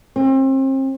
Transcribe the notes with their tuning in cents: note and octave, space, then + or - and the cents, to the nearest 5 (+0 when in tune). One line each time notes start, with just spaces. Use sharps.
C4 +35